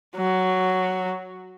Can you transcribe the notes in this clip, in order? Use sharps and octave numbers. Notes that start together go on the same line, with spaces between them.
F#3